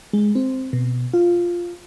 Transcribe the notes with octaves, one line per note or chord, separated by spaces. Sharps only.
G#3
C4
B2
F4